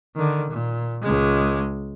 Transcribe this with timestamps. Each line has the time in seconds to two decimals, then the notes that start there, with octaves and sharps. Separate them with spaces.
0.16 D3 D#3
0.51 A#2
1.02 C#2 G#3